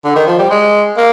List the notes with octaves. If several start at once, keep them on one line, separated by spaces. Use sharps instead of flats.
D3
D#3
F3
G3
G#3
A#3